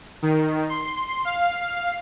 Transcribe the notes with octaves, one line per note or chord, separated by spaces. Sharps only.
D#3
C6
F5